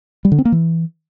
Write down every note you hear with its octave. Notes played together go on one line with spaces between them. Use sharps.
G3
D3
C4
A#3
E3